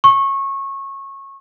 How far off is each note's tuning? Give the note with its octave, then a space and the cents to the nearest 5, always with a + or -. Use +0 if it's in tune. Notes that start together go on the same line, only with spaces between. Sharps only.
C#6 -20